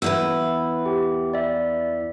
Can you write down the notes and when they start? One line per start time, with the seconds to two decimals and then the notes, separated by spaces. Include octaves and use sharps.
0.02 E2 E4 B4 E6
0.86 G4
1.34 D5 E5